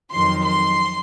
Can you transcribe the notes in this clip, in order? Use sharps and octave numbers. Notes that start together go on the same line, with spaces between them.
F2 D#3 F#3 C6
C6